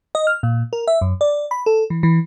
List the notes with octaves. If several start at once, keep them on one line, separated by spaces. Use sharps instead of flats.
D#5
F6
A#2
A#4
E5
F#2
D5
B5
A4
E3
E3